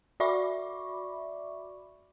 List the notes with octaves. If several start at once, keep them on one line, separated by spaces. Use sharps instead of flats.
F#4 D5 E5 B5 C#6 D6